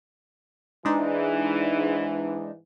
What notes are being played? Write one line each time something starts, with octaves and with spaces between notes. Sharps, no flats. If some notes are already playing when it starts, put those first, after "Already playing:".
G#2 E3 G#3 D4 D#4